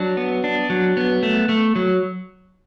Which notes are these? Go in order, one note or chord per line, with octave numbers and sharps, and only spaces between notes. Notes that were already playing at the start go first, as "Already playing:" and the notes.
Already playing: F#3 D4
B3
D4
F#3
B3
A3
A3
F#3